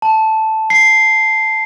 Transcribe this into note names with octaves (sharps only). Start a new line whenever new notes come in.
A5
C7